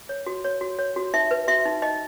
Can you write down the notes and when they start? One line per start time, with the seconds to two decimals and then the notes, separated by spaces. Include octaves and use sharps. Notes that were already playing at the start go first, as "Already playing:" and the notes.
0.09 C#5
0.26 F#4
0.44 C#5
0.61 F#4
0.79 C#5
0.96 F#4
1.14 D#4 E5
1.31 B4
1.48 F#4 E5
1.65 D#4
1.82 D#4 D#5